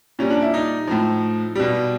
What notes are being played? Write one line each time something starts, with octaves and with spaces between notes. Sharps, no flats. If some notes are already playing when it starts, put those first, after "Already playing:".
A#2 G3 C#4
D4
E4
D#4
A2 F3
B2 G3